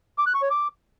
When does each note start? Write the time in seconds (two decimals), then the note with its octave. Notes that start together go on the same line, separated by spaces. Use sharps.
0.18 D6
0.26 F#6
0.34 C#6
0.42 C#5
0.50 D6